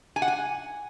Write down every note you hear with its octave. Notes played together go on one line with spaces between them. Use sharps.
G#5
F#5
G#5